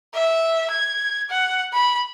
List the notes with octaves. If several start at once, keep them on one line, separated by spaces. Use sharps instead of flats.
E5
G#6
F#5
B5